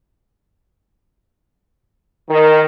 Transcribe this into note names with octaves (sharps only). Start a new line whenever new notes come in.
D#3